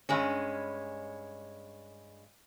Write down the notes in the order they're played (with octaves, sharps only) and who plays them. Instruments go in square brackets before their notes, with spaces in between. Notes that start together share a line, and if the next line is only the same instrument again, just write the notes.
[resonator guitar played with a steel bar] G2 G#3 C#4